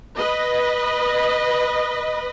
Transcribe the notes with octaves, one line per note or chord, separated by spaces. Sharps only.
B4 D#5